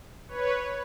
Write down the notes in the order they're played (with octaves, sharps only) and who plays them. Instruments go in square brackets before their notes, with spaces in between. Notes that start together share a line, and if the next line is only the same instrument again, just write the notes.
[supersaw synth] B4 C#5